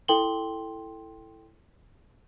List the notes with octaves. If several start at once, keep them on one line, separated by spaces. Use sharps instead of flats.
E4 A4 G5 C6 F#7 G7